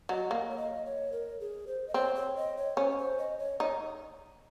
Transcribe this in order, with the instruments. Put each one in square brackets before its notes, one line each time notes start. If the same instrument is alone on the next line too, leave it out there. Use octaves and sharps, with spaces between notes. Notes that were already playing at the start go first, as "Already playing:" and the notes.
[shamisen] F#3 [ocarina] D#5
[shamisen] A#3
[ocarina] C#5
D#5
C#5
A#4
G#4
C5
D#5
[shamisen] C4 [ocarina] C#5
[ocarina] C#5
D#5
C#5
[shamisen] C#4 [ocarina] C5
[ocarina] C#5
C5
D#5
C#5
[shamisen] D#4 [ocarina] C#5